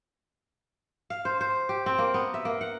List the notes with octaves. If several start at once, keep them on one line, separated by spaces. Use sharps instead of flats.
F5
C5
C5
G4
C4
A#3
B3
E5
A#3
F#5